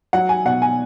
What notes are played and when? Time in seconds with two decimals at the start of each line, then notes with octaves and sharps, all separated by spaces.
0.13 F#3 F#5
0.29 G#5
0.45 B2 F#5
0.62 G#5